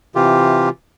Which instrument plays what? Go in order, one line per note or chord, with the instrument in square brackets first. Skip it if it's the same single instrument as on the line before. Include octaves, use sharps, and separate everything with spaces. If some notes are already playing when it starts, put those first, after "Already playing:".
[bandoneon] C3 E3 F4 G4